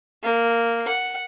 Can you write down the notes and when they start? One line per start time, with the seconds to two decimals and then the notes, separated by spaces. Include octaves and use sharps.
0.23 A#3
0.88 F#5